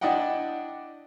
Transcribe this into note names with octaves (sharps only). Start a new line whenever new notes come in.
D4 E4 D5 D#5 F#5 G5